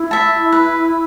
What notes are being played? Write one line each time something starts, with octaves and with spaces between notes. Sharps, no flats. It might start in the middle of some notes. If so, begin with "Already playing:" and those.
Already playing: E4
E5 A5
B4